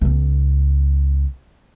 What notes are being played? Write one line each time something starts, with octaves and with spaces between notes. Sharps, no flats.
C#2 B3